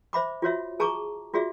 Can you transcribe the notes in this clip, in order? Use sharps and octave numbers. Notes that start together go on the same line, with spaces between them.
C5 E5 B5 D6
F4 F#4 C#5 E5
G#4 A5 A#5 C#6 D6
F4 F#4 G#4 D5 E5